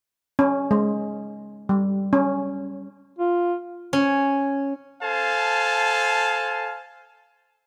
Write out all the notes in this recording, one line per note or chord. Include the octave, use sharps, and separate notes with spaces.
C#4
G#3
G3
C#4
F4
C#4
A4 C5 F5 G#5 A5